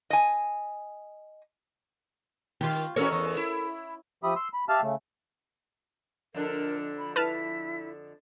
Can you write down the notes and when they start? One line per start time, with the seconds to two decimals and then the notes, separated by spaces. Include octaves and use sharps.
0.10 D#5 G#5
2.61 D#3 F4 G4
2.96 E3 C#4 F#4 A4 A#4 C#5
3.11 E2 D#5
3.37 E4
4.24 F3 G4 E5 B5 D#6
4.36 C6 E6
4.54 B5
4.69 G4 E5 F5 A5 E6 F6
4.82 C#3 A3
6.34 F2 D3 D4 A#4
6.98 B5
7.16 E4 B4 A5 F6